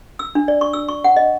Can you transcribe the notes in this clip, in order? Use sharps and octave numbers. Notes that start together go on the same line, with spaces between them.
E6
D4
D5
C#6
E6
C#6
F#5
D#5